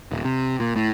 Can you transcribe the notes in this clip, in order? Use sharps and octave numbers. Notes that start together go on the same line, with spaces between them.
D#1
C3
A#2
A2